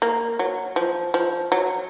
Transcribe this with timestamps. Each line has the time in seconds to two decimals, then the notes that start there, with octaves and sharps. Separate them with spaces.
0.02 A#3
0.39 F#3
0.76 F3
1.14 F3
1.52 F#3